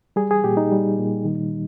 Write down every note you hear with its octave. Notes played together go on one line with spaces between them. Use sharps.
G3 G#4
G#4
A#2 G4
D#4
G3
A#2
D#3